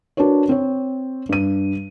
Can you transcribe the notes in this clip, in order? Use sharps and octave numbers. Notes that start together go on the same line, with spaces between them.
D4 F#4 A#4 B4 C#5
C4 C#5
G2 D#7